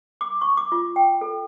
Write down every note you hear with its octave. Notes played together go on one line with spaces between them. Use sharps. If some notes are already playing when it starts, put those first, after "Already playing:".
D6
C#6
D6
F4
G5
A4